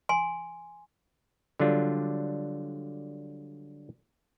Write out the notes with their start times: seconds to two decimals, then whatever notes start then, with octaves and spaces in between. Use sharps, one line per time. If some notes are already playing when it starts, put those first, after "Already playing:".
0.09 G#5 C6
1.60 D3 F#3 G3 D4 F4